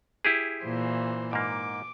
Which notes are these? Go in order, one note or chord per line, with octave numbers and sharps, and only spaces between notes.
E4 G4 G#4
A#2 E3 C5
G#2 A#3 D6